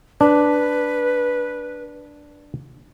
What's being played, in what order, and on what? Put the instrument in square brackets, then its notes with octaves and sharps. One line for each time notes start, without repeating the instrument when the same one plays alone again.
[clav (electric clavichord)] D4 [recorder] B4